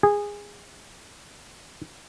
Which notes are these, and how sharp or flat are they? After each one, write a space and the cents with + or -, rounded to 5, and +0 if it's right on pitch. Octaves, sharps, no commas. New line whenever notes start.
G#4 -20